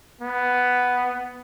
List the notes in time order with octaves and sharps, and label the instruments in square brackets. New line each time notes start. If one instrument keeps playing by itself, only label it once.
[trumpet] B3